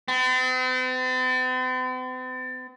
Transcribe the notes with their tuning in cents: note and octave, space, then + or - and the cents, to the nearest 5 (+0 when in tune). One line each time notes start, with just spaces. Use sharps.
C4 -45